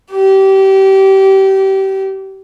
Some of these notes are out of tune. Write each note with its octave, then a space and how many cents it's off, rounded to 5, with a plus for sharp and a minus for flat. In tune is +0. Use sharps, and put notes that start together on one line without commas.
G4 -25